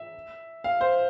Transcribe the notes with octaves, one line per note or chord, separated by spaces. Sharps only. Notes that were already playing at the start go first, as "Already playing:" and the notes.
Already playing: E5
F5
C5